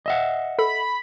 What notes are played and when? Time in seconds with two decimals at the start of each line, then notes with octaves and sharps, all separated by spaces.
0.06 D#5 E5 F#5
0.59 A4 B5